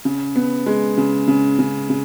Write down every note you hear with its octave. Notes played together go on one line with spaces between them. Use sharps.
C#3
B3
G#3
C#3
C#3
C#3
C#3